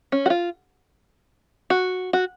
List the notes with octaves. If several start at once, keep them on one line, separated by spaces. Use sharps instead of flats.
C#4
F#4
F4
F#4
F#4